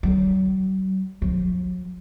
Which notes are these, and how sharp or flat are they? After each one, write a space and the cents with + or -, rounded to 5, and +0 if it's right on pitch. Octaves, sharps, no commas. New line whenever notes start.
F#3 +40
F#3 -40